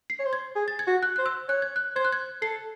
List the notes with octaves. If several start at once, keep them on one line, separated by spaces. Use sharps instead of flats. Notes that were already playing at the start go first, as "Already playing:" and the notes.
C7
C#5
C5
G#6
G#4
A6
G#6
F#4
F#6
C5 F#6
E6
C#5 F#6
G#6
F#6
C5 G#6
F#6
G#6
A4 C7